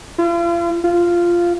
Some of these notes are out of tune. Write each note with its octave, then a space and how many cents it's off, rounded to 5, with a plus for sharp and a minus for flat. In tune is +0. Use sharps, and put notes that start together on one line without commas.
F4 -40
F4 -10